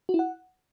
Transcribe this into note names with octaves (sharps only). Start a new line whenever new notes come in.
F#4
E4
F#5